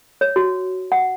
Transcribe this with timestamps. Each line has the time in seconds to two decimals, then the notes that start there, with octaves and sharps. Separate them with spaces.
0.21 C#5
0.36 F#4
0.92 F#5